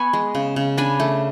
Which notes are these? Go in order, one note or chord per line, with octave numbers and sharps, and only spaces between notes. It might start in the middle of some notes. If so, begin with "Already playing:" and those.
Already playing: B3 G#5 B5 C#6
G#3
C#3
C#3
D4 G#5 B5
A3